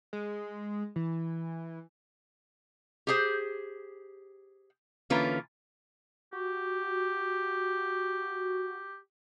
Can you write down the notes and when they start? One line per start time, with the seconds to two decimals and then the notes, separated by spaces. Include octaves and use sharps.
0.13 G#3
0.96 E3
3.07 G4 G#4 C5
5.10 D3 E3 A#3 C#4 F4 B4
6.33 F#4 G4